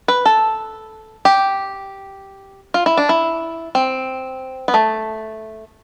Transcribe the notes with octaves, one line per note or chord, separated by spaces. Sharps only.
B4
A4
G4
F4
E4
D4
E4
C4
B3
A3